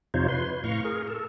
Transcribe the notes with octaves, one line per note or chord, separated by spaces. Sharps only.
F2 C3 D#4 F4 C5 C#5
B4 C6
A2 F5 A#5 C#6
G#4 A#4
A4